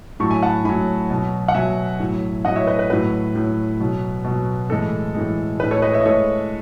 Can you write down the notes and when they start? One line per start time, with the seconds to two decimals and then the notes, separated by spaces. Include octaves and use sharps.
0.20 A2 F#3 A5 C#6
0.31 G#5 B5
0.43 F#5 A5
0.65 A2 F#3 G#5 B5
1.10 B2 F#3
1.48 F#5
1.54 B2 F#3 E5 G#5
2.00 A2 F#3
2.45 A2 F#3 D#5 F#5
2.56 C#5 E5
2.67 B4 D#5
2.79 B4
2.90 A2 F#3 B4
3.35 A2 F#3
3.80 B2 F#3
4.24 B2 F#3
4.70 A2 E3 G#3 A4
5.15 A2 E3 G#3
5.60 A2 G#3 B4
5.71 A4 C#5
5.82 B4 D#5
5.93 C#5 E5
6.01 D#5
6.06 A2 G#3 A4 C#5